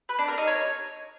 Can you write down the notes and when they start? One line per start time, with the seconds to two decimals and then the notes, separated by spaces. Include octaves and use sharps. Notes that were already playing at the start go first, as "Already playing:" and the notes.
0.09 B4
0.19 D4
0.28 A#4
0.38 D#4
0.47 C#5